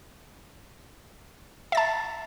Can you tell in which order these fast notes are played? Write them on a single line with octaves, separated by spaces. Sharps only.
E5 A6 A5